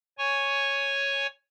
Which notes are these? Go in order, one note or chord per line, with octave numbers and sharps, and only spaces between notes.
C#5 G#5 C#6